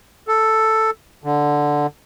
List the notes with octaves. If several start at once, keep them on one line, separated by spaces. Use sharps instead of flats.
A4
D3